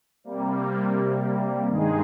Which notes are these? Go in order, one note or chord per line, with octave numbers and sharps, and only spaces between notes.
C3 G3 A#3
G2 D#3 G#3 D#4 G#4